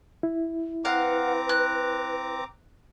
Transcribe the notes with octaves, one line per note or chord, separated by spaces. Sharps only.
E4
C4 B4 F5 F#5 A#5 D6
F#6